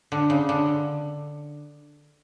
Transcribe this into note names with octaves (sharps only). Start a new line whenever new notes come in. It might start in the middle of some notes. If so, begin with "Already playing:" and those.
D3
C#3
D3